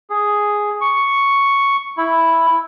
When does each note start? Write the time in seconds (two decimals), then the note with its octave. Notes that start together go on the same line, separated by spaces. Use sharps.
0.10 G#4
0.81 C#6
1.97 E4